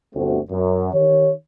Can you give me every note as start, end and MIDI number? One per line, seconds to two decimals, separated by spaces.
0.15 0.40 31
0.15 0.40 38
0.15 0.40 57
0.15 0.40 60
0.15 0.40 66
0.51 0.90 42
0.93 1.31 51
0.93 1.31 63
0.93 1.31 67
0.93 1.31 73